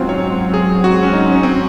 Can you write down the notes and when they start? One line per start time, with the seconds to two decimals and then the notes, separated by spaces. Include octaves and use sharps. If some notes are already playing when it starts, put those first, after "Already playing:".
Already playing: G#2 F#3 C4 C#4 F4
0.09 C#5
0.54 G#4
0.84 F#4
1.03 C#4
1.13 D#4
1.32 C#4
1.43 C4